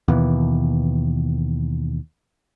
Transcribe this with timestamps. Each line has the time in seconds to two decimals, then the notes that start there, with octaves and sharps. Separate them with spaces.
0.08 D#2 B2 E3